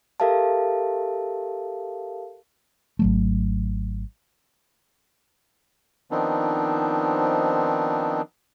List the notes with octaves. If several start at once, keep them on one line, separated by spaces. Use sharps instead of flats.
G4 A4 A#4 E5 F5 A5
G#1 F#3 A3
D#3 F3 B3 C4 D4 D#4